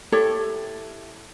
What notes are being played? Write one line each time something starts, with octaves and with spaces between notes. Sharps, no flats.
E4 G4 A4 C#5